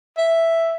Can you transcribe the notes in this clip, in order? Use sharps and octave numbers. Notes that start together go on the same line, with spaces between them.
E5